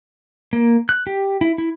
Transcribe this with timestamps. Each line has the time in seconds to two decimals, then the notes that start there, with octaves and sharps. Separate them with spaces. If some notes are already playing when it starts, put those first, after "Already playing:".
0.53 A#3
0.89 F#6
1.07 G4
1.41 E4
1.58 E4